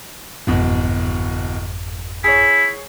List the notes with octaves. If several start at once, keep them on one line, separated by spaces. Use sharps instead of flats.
D1 G1 F2 G#2 B2
E4 G#4 C#5